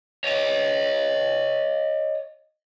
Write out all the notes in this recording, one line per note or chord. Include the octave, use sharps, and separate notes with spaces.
C#5 D#5